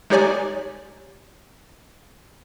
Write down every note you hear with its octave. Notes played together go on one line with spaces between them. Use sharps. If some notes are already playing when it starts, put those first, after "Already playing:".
G#3 D#4 G4 C#5 D5 G#5